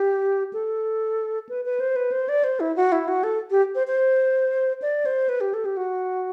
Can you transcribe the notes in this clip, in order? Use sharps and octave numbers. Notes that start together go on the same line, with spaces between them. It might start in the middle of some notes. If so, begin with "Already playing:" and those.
Already playing: G4
A4
B4
B4
C5
B4
C5
D5
C5
E4
F#4
E4
F#4
A4
G4
C5
C5
D5
C5
B4
G4
A4
G4
F#4